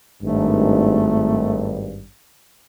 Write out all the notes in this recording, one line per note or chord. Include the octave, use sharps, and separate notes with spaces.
G#1 G2 A3